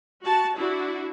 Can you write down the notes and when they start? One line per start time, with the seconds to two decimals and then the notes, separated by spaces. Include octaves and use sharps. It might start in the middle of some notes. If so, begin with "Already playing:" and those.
0.23 F#4 A5
0.57 D4 E4 F#4